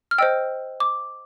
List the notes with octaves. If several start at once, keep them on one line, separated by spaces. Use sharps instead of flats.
F6
C5 D#5 G5 E6
D6